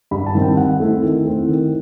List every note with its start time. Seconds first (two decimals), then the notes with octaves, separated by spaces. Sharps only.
0.11 G2 B5
0.26 A5
0.34 D#3 G3 C4
0.42 G5
0.57 D#3 F#5
0.80 A3 C4 E4
1.03 D#3
1.25 A3 C4 E4
1.48 D#3